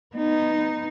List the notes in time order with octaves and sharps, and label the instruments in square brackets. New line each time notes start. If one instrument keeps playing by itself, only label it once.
[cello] B3 D#4